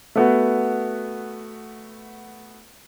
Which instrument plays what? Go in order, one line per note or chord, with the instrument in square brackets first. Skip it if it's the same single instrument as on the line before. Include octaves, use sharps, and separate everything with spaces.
[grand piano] A3 B3 F#4